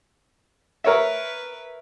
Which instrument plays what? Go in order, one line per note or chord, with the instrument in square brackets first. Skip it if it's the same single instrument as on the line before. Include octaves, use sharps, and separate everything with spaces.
[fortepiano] A#4 C#5 E5 [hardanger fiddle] B4